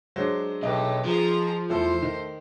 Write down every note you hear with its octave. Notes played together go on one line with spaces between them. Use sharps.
F#3 G#3 D4 C5
B1 A3 G4 B4 D#5
F3 G#4 A#5
E2 A3 E4 A4 C5
D#3